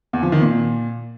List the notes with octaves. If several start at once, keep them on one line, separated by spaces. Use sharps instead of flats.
E2
F3
D#3
A#2